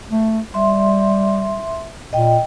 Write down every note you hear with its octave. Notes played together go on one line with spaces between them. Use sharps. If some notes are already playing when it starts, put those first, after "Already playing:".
A3
G3 E5 C6
A#2 D#5 G5